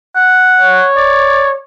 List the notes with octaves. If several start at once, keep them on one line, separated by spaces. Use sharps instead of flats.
F#5
C#5
D5